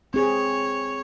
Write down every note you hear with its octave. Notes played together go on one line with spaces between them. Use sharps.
C4 G#4 C#5